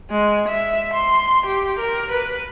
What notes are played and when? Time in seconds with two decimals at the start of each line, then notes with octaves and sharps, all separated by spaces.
0.11 G#3
0.49 E5
0.94 C6
1.47 G4
1.80 A#4
2.12 B4